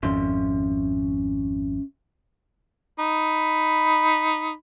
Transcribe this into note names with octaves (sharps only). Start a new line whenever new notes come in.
G#1 F2 C#4 E5 C6
D#4 B5